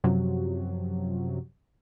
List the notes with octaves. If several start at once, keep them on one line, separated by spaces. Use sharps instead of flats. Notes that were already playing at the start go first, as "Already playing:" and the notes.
F#2 C3 F3 F#3